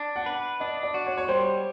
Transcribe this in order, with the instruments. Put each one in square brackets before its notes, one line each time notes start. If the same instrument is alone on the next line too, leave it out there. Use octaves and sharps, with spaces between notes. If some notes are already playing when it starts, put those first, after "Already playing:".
Already playing: [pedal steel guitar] D4
[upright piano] F#5
[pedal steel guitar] B4
[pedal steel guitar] D4 [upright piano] D#5
[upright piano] D5
[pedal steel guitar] F#4
[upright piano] C#5
C#5
[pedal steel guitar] G3 [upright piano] C5